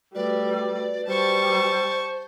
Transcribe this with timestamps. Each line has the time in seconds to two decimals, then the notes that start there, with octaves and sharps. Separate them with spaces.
0.15 G3 A3 F#4 B4 D5
1.07 G3 C5 A5 C#6